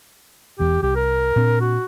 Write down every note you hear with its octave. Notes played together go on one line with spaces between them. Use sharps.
E1 E2 B3 G4
C2 G4
A#4
A#2 C4 D4
F#4